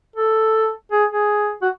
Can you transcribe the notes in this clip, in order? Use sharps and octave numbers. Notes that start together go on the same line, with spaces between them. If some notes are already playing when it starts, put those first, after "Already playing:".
A4
G#4
G#4
F#4